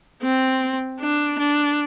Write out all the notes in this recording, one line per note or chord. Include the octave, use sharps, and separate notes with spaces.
C4
D4
D4